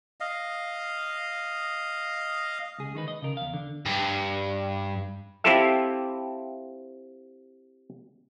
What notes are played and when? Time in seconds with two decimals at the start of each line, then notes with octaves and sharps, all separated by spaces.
0.20 D#5 F5
2.79 C#2 G#4
2.95 D#3 D#4 B4
3.08 D#5
3.22 C#3 A#4
3.37 E2 F5
3.54 D3
3.86 G2
5.44 C4 E4 F4 G4 A4 E5